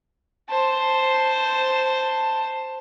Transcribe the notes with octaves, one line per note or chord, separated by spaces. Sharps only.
C5 A5